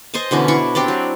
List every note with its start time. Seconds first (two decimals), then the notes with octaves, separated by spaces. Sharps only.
0.14 C5 D#5 G#5 A5
0.31 B2 D3 E3 C#4
0.48 D4 E4 C#6
0.75 C4 D4 G4 D5
0.88 F#3